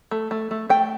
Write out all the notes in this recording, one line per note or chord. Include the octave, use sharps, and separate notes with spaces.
A3
A3
A3
A3 G5